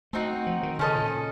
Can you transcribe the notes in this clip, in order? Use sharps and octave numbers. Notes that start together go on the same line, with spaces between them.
A3 C4 D#4 F#4
F3
D#3
C#3 C#4 A4 C5 D#5
A#2